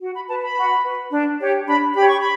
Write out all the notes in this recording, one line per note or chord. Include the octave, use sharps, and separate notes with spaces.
F#4
B5
B4 A5
B5
F#4
B4
D4
G4 C#5
D4 B5
G4 C#5 B5
C#6
B5